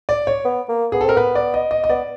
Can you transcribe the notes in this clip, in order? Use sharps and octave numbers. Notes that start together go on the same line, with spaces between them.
D5
C#5
B3
A#3
B3 G#4
A4
C4 A#4
B3 B4
D5
D#5
D#5
D#5
B3 D5